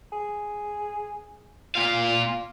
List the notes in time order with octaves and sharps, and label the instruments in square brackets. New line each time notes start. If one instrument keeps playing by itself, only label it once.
[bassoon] G#4
[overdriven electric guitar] A#2 F5 [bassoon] F4